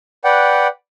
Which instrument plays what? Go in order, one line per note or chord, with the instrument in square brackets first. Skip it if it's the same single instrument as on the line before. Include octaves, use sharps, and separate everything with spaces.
[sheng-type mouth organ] B4 D5 F#5 G5